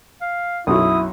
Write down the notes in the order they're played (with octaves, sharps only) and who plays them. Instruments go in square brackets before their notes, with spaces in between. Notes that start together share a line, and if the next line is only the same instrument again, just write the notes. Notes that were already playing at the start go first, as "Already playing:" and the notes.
[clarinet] F5
[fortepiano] B1 F#2 F#4 [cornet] E4 [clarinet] D#6